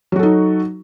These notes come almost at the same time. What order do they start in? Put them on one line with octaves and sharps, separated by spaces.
F#3 F#4 A4 D#4